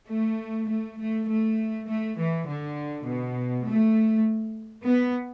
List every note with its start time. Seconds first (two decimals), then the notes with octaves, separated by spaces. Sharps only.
0.09 A3
0.68 A3
0.99 A3
1.28 A3
1.87 A3
2.18 E3
2.48 D3
3.07 B2
3.67 A3
4.85 B3